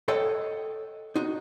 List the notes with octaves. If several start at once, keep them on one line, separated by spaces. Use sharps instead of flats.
A4 C#5 D#5 F#5 G5
D#4 F#4